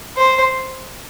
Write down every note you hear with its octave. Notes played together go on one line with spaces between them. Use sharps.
C5